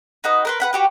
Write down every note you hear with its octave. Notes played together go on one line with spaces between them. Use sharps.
D#4 F#4 B4 D#5
A#4 B4 C6
B4 F#5 B5
F#4 G4 B4